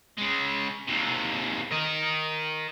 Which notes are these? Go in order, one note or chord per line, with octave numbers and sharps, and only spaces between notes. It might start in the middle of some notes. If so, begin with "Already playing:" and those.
C#3 G#3
D#2 C3
A#4 D#5